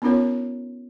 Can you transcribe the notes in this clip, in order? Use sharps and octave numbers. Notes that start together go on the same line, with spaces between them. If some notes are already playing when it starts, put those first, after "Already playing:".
B3 C#4 D#4 F4 A#4 C#5